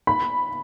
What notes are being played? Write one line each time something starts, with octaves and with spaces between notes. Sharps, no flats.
B5